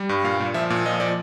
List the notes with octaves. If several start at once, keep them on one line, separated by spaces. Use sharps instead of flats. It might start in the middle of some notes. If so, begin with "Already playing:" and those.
Already playing: G3
G2
A#2 F5
A#2
F3 E5
A#2
F3 D#5
F3 D5